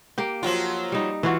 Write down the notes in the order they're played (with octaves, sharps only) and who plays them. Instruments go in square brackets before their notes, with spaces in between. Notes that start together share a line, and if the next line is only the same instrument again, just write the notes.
[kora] A#3 G4 G5
[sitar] F3 F#3 F4
[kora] G3 D#4
E3 F4 F#4